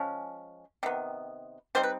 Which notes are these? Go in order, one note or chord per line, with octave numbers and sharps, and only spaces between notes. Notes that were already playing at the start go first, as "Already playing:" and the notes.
Already playing: F3 G#3 C#4
C3 D#3 B3
G3 C4 D#4 C5
B4